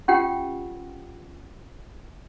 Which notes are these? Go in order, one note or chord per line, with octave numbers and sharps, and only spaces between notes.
C#4 F4 G4 F#5 G5